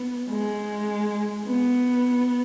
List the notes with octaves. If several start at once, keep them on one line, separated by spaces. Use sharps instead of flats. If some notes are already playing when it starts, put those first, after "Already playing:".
Already playing: B3
G#3
B3